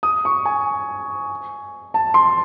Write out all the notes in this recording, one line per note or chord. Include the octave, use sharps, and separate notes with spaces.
D#6
C#6
G#5
A5
C6